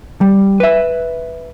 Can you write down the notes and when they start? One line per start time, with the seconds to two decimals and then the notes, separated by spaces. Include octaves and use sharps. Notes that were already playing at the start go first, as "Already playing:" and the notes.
0.21 G3
0.60 B4 E5